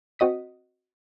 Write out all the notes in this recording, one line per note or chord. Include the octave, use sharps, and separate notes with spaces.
C4 F#4 D#5 D#6 B6